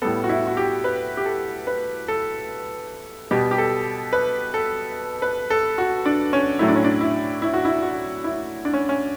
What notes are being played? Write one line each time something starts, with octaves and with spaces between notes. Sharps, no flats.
A2 G3 B3 A4
F#4
E4
F#4
G4
B4
G4
A4
B4
A4
B2 G3 B3 G4
G4
A4
B4
A4
B4
A4
F#4
D4
C#4
A2 F#3 A3 E4
D4
C#4
D4
E4
E4
F#4
E4
F#4
E4
D4
C#4
C#4